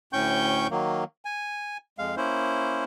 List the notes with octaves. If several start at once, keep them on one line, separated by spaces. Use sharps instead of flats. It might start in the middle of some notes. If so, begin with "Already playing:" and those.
D2 A2 C#4 G5 C#6 G6
D#3 F#3 A#3
G#5
F2 G#3 F5
A#3 C#4 E4 C5